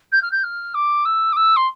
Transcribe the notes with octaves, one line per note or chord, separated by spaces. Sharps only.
G6
F6
G6
F6
D6
E6
D6
E6
C6